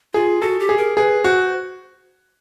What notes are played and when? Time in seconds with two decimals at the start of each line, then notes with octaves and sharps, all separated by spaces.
0.14 F4 G#4
0.41 F#4 A4
0.59 G4
0.69 G#4
0.77 A#4
0.97 G#4 B4
1.24 F#4 C5